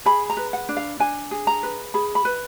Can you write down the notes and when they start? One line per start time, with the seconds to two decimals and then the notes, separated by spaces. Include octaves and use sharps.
0.06 G#4 B5
0.30 A#5
0.37 B4
0.53 F#5
0.69 D4
0.77 F5
1.00 D4 G#5
1.31 G#4
1.47 A#5
1.63 B4
1.94 G#4 B5
2.15 B5
2.25 B4